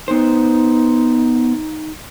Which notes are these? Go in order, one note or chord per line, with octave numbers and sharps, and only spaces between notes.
B3 D#4 C5